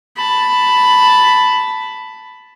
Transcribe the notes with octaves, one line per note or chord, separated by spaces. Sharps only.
A5 B5